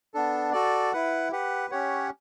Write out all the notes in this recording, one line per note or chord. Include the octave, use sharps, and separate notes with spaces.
B3 D4 A4
F#4 A4 D5
E4 B4 F#5
G4 B4 F#5
C#4 G4 C#5 F#5